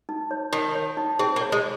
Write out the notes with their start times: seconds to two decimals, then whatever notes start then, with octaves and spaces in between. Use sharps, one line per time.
0.09 D#4
0.31 C#5
0.53 D#3 D#4
0.75 C#5
0.97 D#4
1.19 C4 G#4
1.36 A#3
1.41 C#5
1.52 G#3